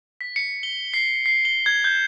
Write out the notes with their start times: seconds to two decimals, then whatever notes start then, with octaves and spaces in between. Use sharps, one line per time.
0.21 B6
0.36 C#7
0.63 G7
0.94 C7
1.26 C7
1.45 G7
1.66 G#6
1.84 G6